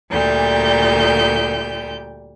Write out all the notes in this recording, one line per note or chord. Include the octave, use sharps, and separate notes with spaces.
D2 A#2 G3 G6